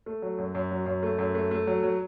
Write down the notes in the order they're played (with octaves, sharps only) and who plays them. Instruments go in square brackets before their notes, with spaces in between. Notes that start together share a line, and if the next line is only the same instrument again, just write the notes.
[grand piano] A3
F#3
F#2
F#2
F#3
F#2
A3
F#2
A3
A3
F#3
F#3